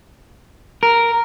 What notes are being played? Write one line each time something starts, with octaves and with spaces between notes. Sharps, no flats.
A#4